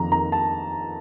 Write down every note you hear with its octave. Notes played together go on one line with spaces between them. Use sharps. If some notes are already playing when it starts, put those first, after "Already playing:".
Already playing: F2 D#3 A#3 A#5
D#3 A#5
A5